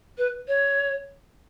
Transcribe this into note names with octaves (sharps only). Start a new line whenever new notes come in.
B4
C#5